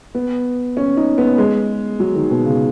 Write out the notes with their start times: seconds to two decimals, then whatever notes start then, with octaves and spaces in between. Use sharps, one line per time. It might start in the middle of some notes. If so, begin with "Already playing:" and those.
0.15 B3
0.77 C#4
0.97 D#4
1.18 B3
1.38 G#3
2.00 F#3
2.16 D#3
2.31 B2
2.45 C#3